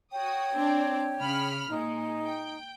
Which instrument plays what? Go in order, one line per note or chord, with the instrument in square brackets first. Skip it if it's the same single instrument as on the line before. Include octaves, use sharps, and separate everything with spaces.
[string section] F#4 D#6 [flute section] C#5 G5
[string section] C4 D4 D5
C#3 B5 F6
[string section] A#2 G#3 [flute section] D#4
[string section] G5